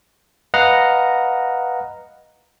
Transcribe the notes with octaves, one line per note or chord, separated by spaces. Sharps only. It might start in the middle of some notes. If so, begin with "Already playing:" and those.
B4 D#5 F5 F#5 A#5 F6